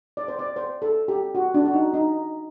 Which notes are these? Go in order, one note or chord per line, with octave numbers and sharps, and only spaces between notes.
D5
C5
D5
C5
A4
G4
F#4
D4
F#4
D#4
D#4